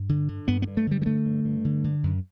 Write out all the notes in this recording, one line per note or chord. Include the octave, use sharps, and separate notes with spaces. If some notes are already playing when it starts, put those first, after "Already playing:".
Already playing: G2
D3
D3
G2 B3
B3
G2
A3
D3 G3
G3
D3 A3
G2
G2
D3
D3
F#2